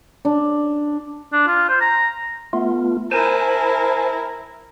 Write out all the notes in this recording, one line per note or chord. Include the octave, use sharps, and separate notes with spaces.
D4
D4
F4
C5
A#5
A3 B3 F4
E4 A#4 C5 G#5 A5